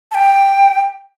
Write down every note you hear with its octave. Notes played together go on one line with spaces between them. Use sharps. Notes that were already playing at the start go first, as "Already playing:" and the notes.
A5
G5